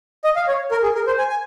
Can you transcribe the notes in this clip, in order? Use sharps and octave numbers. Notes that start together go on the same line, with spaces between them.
D#5
F5
C#5
A#4
G#4
A#4
C5
G#5
G#5